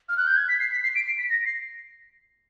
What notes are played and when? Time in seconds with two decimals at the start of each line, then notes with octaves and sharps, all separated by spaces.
0.09 F6
0.17 F#6
0.27 G6
0.36 G#6
0.48 B6
0.60 C7
0.71 B6
0.83 C7
0.95 D7
1.06 C7
1.18 B6
1.29 A#6
1.45 C7